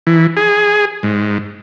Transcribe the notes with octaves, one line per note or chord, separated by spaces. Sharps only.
E3
G#4
G#2